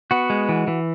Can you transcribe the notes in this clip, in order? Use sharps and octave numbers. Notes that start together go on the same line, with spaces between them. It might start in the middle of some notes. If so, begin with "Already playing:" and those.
B3 F#4
G#3
E3
E3